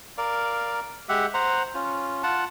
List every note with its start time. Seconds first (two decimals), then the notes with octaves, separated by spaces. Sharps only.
0.18 A#4 D5 F5
1.09 G#3 G4 E5 F#5
1.34 C5 F#5 A#5
1.74 C#4 F4
2.23 F4 F#5 A5